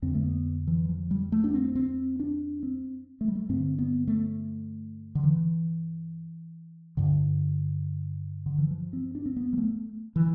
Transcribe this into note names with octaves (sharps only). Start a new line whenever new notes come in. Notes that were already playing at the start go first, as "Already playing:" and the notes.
F2 D3 C4
A3
B3
E3
F3
G3
A3
D4
C4
C4
D4
C4
A3
G3
A3
G2 D3 C4
B3
A3
D3
E3
G2 D3
D3
E3
F3
C4
D4
C4
B3
G3
A3
E3